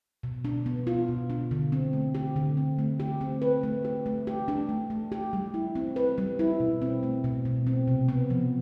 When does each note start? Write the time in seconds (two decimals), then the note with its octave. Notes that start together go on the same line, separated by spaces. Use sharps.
0.23 B2
0.45 D4
0.66 B3
0.87 F4
1.08 B2
1.30 D4
1.51 D3
1.72 C4
1.93 A3
2.15 G4
2.36 D3
2.57 C4
2.79 A3
3.00 G4
3.21 C4
3.42 B4
3.63 A3
3.85 G4
4.06 A3
4.27 G4
4.48 D4
4.69 A3
4.90 A3
5.12 G4
5.33 G3
5.54 E4
5.75 C4
5.96 B4
6.18 G3
6.39 E4
6.60 B2
6.82 C4
7.03 A3
7.24 B2
7.45 B2
7.67 C4
7.88 C3
8.08 B3
8.30 F3